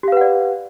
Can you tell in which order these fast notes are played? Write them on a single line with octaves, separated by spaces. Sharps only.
G4 F5 B4 F#5 D5